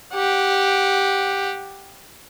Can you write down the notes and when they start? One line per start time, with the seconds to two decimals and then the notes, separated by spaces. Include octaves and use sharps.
0.14 G4 F#5